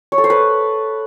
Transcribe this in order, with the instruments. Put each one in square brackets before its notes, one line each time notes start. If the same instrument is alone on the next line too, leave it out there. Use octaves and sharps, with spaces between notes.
[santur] C#5
A4
C5
B4